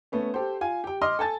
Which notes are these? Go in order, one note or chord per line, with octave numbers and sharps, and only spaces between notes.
A3 B3 C#4
G4 A4 C5
F4 G#5
G4 G5
D#5 C6 D6 D#6 F6
A4 G#5 A5 A6